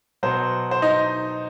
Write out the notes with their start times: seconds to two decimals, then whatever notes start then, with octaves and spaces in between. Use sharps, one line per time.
0.23 B2 F#3 C5
0.71 C5
0.82 D#4 D#5